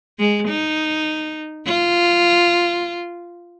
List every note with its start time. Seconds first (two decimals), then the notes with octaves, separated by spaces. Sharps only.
0.19 G#3
0.48 D#4
1.66 F4